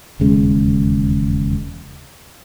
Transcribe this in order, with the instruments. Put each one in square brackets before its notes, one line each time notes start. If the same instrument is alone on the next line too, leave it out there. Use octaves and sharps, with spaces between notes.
[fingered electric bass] E1 D#2 C#3 G#3